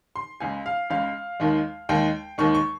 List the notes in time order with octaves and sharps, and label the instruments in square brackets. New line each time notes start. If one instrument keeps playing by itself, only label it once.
[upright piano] C6
C#2 C#3 G#3 G#5
F5
C#2 C#3 G#3 F5
D#2 D#3 G#3
D#2 D#3 G#3 G5
D#2 D#3 G#3 C#6
C#6